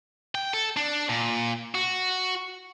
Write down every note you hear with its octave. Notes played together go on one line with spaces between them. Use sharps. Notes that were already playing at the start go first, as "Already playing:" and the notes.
G5
A4
D4
A#2
F#4